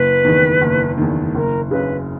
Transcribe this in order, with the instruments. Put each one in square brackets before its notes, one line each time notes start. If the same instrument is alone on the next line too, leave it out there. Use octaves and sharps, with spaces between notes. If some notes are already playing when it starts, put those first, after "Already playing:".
Already playing: [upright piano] F#1 [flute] B4
[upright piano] E2 D#3
F#1
E2 D#3
[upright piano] F#1 [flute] A#4
[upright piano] F#2 C#3 [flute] B4